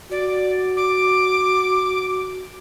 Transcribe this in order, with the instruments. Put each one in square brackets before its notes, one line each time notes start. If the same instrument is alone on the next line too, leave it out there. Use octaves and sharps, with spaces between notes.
[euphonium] F#4 [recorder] D5
[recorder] D6